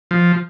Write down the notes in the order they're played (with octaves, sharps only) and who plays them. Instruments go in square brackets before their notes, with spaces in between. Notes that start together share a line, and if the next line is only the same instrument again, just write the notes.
[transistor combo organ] F3